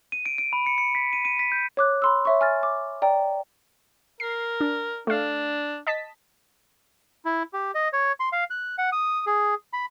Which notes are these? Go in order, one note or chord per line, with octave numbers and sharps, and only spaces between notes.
D#7
D7
D7
B5
C#7
C#7
B6
D#7
D#7
B6
G6
C#5 D6 F#6
B5 C6 E6
C#5 E5 C#6
G#5 F6 A6
D6
D5 G5 A#5
A#4 C7
D4
A3 D4 F5
D#5 A5 B6
E4
G4
D#5
C#5
C6
F5
F#6
F#5
D#6
G#4
B5